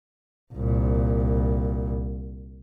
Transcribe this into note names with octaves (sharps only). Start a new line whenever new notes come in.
C2 A#2